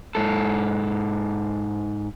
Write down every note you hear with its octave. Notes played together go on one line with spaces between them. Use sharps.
G#2 A4